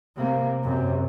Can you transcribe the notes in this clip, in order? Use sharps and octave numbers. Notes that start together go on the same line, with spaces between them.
C3 A#3
F#2 C3